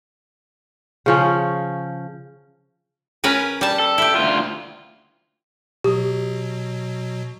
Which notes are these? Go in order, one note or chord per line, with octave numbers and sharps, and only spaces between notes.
C#3 F3 C#4
C#4 A#4 B4
G3 A5
A4
E4 G4
D2 F4
B2 F#3 G4 D#6